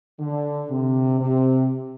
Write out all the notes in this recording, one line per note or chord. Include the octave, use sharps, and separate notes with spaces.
D3
C3
C3